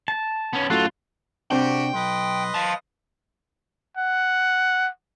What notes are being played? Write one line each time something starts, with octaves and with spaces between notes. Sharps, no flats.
A5
B3 C#4
F#2 A2 F4 F#4 A4
C3 C4 D4 F#4 G4 G5
B1 B4 D#5 C6
F5 A5
F#5